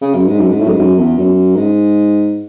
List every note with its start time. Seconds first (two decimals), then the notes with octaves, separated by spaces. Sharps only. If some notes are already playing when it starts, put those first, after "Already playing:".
0.01 C#3
0.14 F#2
0.27 G#2
0.40 F#2
0.50 G#2
0.60 A2
0.66 F#2
0.69 G#2
0.79 F#2
0.99 E2
1.17 F#2
1.56 G#2